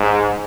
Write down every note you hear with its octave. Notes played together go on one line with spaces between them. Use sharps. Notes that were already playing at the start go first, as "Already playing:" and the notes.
Already playing: G#2